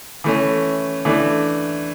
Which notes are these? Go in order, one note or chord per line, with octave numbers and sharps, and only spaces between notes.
E3 A3 C#4
E3 A3 D4